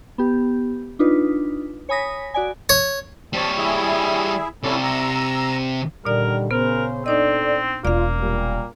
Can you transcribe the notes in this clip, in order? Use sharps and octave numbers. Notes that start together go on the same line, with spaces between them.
B3 G4
D4 D#4 F4 B4
C#5 G#5 B5 D#6 A#6 B6
F#4 D5 G#5
C#5
G3 C4 C#5 A5
E4 G#4 E5
C3 C#4 E4 A4 D5
A#5 E6
A#2 D3 D#3 G3 A#4 D5
C#3 B3 A#4 C5
C4 D4 D#4 A4 D5 D#5
E1 A#3 F4 D5 F5
A#2 G3